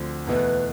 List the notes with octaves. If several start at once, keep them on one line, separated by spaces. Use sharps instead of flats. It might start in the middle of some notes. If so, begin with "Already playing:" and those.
Already playing: D2 D3 F3 C4
E2 B2 A3 B4